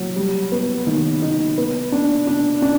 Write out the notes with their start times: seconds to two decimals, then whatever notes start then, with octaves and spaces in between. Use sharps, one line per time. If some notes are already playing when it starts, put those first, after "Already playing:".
Already playing: F#3
0.16 G3
0.52 B3
0.87 D#3
1.22 D#4
1.58 B3
1.92 D4
2.27 D4
2.62 D4